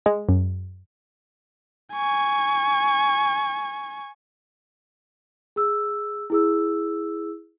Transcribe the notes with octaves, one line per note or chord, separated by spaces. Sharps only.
G#3
F#2
G#5 C#6
G#4 E6
E4 G#4 E6